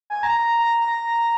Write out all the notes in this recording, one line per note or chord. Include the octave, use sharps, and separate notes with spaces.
G#5
A#5
A#5
A#5
A#5